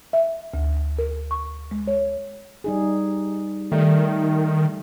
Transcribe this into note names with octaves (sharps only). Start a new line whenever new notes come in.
E5
D2
A#4
C#6
G#3
C#5
G3 D#4 G#4
D#3 G3 A3